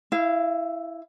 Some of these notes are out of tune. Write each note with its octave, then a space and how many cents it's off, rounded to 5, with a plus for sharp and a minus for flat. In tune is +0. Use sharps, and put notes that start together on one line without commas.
E4 +0 F5 -30